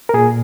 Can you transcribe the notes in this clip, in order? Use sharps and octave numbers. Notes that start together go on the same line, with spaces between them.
A#4
A#2 G#4